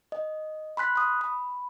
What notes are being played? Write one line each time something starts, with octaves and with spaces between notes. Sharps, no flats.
D#5
B5 C6 F#6 B6
B5 D#6
B5